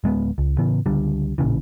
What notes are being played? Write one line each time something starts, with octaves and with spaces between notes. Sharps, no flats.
D1 G#3 A3 B3
C#2
A2 C#3 E3 B3
C#2 D3 G3
A1 A#2 C#3 E3